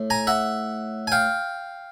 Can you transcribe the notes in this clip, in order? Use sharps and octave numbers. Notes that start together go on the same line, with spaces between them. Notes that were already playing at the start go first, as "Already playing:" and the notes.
Already playing: A2
G#5 A#5
E5 F#5
G#5
F5 G5